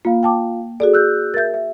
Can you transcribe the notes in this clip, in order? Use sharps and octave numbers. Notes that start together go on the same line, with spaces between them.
A#3 F4 F5
G5 A5 D6
F#4 G#4 A4 D5
E6 F#6 G6
A#4 E5 G6 A6
E5